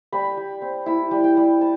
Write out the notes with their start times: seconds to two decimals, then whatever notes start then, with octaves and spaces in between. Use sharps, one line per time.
0.12 G3 B5
0.37 G3
0.62 C4
0.86 E4 B5
1.11 G3
1.24 G5
1.37 G3
1.61 A5